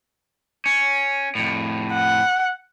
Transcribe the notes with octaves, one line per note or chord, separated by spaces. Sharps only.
C#4
F2 A2
F#5